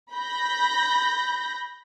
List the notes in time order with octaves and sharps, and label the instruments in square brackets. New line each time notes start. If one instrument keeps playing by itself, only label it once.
[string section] B5 G6 A#6